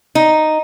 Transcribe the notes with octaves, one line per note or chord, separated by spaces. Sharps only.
D#4